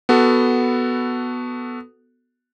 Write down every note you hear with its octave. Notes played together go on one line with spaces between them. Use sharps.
B3 F#4 A4